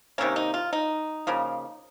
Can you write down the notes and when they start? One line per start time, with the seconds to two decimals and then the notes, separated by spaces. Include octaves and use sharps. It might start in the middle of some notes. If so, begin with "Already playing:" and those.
0.18 C3 D#3 A#3 C#4
0.36 D#4
0.54 F4
0.73 D#4
1.27 C#3 F3 A#3